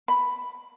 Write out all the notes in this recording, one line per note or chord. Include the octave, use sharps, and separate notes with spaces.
B5